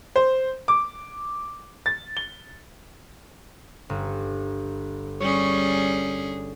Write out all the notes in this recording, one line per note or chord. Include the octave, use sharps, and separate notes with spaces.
C5
D6
A6
G7
G1
G3 C#4 G#4 C#5